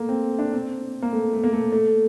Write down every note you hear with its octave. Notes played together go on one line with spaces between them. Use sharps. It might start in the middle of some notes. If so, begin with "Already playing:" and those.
Already playing: A3 A#3
C4
D4
C4
A#3
A3
A3
A#3
A3
A3